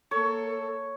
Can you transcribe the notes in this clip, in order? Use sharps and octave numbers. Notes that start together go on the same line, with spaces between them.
A#3 A4 C#5